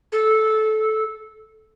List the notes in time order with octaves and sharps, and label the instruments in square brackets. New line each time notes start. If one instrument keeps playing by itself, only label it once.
[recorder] A4